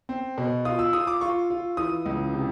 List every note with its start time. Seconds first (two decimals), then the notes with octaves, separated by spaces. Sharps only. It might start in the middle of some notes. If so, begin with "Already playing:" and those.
0.09 C4
0.38 B2
0.65 F4 D#6
0.79 E6
0.93 F4 D#6
1.07 D6
1.21 F4 C#6
1.50 F4
1.77 E3 D#6
2.06 C#2
2.34 C3